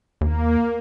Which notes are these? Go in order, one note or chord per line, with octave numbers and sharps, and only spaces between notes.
D#2 A#3